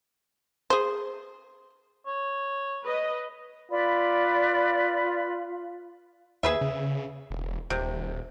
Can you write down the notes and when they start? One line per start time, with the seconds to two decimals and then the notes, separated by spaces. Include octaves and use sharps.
0.70 G#4 C5
2.07 C#5
2.82 B4 D#5
3.71 F4 B4 D5 B5
6.43 D#2 G#4 B4 E5
6.61 C#3
7.30 E1
7.70 D#1 C3